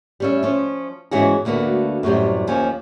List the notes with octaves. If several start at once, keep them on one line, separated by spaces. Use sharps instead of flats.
G3 C#4 E5
F3 C#4
G#2 E3 B3 C#4 F#4 G#4
D2 D3 A#3 B3 F#4
F#2 A2 C3 G3
D#2 F3 C#4 G#5